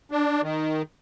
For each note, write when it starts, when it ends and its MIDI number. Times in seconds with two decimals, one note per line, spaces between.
0.11 0.41 62
0.43 0.82 51